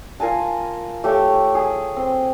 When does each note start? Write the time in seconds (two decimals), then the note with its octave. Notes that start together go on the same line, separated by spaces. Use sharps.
0.20 F4 A#4 G#5 A5
1.04 A3 G4 C#5
1.55 G#4
1.96 C4